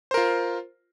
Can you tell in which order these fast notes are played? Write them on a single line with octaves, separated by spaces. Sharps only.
C5 A#4 F4